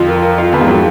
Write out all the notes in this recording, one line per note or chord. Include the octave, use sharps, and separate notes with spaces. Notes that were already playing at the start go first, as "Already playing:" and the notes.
Already playing: F2 F4
A#4
A#4
F4
F2 B3
G#2
F#3